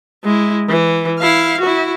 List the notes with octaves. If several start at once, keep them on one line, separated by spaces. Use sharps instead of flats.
G#3 E4
E3
E4 F5
E4 F#4